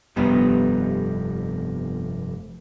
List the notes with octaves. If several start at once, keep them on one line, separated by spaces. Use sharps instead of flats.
F1 G2 G3 B3 D#4